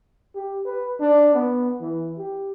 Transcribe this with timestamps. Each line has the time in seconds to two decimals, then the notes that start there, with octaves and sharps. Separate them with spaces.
0.35 G4
0.65 B4
1.00 D4
1.34 B3
1.81 E3
2.18 G4